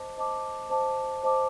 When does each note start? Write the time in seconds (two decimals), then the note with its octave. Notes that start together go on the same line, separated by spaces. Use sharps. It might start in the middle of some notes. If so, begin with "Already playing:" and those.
Already playing: C5 D#5 A5 D6
0.17 C5 D#5 A5 D6
0.70 C5 D#5 A5 D6
1.23 C5 D#5 A5 D6